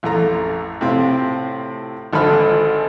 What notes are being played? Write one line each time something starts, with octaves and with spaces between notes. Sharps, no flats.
A1 F2 A3 A#5
A2 C3 C4 F4
G#1 D3 F3 A4 B5 F6